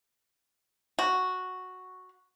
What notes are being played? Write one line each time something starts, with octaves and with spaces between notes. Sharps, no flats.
F#4